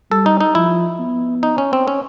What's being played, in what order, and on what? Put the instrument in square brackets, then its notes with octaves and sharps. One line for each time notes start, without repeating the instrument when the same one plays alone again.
[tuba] G3 [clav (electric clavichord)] A4
[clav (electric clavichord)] D#4
D#4
[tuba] F3 [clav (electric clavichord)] E4
[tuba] B3
[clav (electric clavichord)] D#4
C#4
C4
C#4